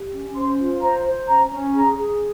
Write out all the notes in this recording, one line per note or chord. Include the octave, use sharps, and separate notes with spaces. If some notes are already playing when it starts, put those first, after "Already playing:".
Already playing: G4
C#4
C5 C6
F4
C5 A#5
C5
C#4 A#5
C#4
G#4 A#5
G#4